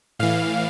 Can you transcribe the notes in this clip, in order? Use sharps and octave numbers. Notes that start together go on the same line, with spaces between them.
A2 E3 F5